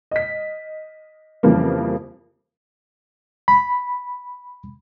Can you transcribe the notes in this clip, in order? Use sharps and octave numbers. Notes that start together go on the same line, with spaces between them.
D#5 B6
F2 C#3 E3 F3 G3 A#3
B5